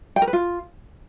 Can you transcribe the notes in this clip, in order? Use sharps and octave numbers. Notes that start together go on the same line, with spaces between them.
G5
A#4
B4
F4